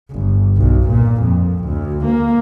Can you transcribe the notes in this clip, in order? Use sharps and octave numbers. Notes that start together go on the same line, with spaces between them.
G1
B1
A#2
F2
D2
A#3